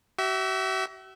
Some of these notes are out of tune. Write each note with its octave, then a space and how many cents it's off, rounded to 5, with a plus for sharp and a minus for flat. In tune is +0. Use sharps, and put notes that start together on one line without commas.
F#4 +45 E5 -5